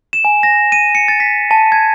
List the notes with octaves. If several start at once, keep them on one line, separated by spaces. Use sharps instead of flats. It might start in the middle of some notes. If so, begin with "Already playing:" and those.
E7
G#5
A#6
D#7
C#7
A6
B6
A5
G#6